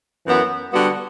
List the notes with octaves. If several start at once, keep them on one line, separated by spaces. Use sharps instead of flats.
F#2 E3 B3 F#4
D3 G3 B3 F#4